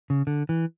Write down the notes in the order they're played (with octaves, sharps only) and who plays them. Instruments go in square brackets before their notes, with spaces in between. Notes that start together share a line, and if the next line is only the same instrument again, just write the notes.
[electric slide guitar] C#3
D3
E3